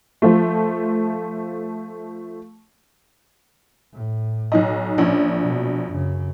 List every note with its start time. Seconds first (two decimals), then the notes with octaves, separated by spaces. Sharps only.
0.22 F3 A3
3.93 A2
4.52 B1 D#4 D#5
4.98 A#1 C#4 D4
5.40 B2 F#3
5.90 F#2 C#3